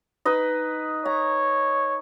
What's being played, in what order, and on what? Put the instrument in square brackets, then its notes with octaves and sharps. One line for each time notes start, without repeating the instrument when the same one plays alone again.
[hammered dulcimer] D#4 B4 D#5
[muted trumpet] C#5 [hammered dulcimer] A#5